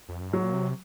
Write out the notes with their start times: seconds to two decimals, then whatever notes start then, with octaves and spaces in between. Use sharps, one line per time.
0.09 F2
0.20 F#2
0.31 G#2 F#3
0.43 A#2
0.53 C3